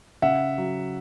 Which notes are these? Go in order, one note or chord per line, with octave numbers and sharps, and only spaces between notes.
C#3 E5 F#5
F#3